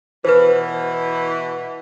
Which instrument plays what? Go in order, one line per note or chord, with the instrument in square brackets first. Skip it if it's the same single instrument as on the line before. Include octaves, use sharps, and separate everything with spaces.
[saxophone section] B2 E3 [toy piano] B4 C5